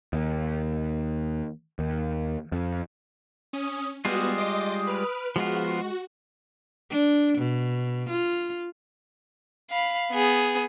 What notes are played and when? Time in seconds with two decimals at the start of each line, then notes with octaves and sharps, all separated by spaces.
0.13 D#2
1.79 D#2
2.52 F2
3.53 C#4 D#6
4.05 G3 G#3 B3 F4 F#4 D#6
4.38 D#5 C6 D6
4.87 B4 F6 D7
5.36 F3 G#3 B3 F4 F#4
6.90 D4
7.38 B2
8.09 F4
9.71 F5 B5
10.12 B3 G#4